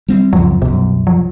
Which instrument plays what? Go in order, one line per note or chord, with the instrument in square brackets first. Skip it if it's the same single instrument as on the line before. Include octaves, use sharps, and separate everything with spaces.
[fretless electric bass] G3 C4
[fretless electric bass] C#2 F#2 [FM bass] F3
[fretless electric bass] C2 F#2 [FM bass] B2
[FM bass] F3